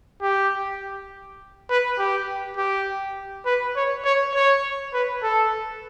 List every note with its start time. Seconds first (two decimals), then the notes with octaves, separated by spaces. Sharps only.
0.21 G4
1.69 B4
1.98 G4
2.57 G4
3.45 B4
3.76 C#5
4.04 C#5
4.35 C#5
4.93 B4
5.23 A4